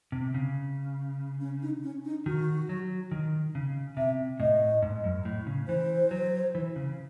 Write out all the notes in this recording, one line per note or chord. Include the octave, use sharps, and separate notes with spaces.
C3
C#3
C#4
D#4
C#4
D#4
D#3 F#4
F#3
D#3
C#3
C3 E5
A2 D#5
G#2
F#2
A2
C#3
E3 C5
F#3
E3
C#3